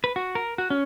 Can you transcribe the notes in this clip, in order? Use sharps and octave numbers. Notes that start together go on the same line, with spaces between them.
B4
F#4
A#4
F#4
C#4